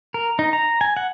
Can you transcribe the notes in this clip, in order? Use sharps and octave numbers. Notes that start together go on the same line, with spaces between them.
A#4
D#4
A#5
G#5
F#5